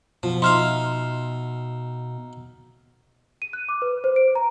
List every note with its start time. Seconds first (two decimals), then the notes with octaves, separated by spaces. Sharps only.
0.23 B2 F3
0.42 D#4 E5 F5 C6 F6
3.42 D#7
3.53 F#6
3.69 D6
3.82 B4
4.04 C5
4.16 D7
4.35 A#5